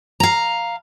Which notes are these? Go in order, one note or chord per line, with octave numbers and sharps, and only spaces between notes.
F5 A#5